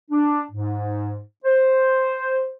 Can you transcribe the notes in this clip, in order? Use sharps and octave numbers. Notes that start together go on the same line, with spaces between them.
D4
G#2
C5